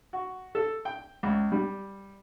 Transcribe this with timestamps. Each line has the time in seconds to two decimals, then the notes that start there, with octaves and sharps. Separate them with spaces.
0.13 F#4
0.55 A4
0.85 G5
1.23 C#2
1.52 G3